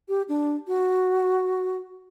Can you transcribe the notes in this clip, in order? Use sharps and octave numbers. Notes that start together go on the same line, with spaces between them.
G4
D4
F#4